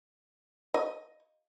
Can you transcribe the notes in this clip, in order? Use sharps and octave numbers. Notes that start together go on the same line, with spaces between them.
D#5